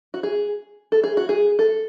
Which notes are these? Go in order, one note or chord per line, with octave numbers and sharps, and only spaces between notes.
F#4
G#4
A4
G#4
F#4
G#4
A4